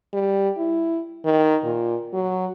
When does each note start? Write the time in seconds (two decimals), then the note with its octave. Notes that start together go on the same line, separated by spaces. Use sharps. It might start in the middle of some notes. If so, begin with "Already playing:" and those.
0.13 G3
0.57 E4
1.25 D#3
1.64 A#2
2.14 F#3